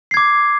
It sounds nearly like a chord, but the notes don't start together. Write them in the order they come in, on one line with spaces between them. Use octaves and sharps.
C7 G#6 D6